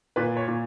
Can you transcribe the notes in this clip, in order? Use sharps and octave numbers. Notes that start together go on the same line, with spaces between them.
A#2 B4
C#5
A#2